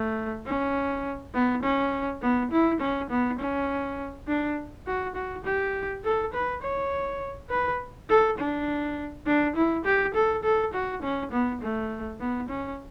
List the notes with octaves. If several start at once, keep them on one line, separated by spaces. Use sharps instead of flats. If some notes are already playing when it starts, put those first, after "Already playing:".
Already playing: A3
C#4
B3
C#4
B3
E4
C#4
B3
C#4
D4
F#4
F#4
G4
A4
B4
C#5
B4
A4
D4
D4
E4
G4
A4
A4
F#4
C#4
B3
A3
B3
C#4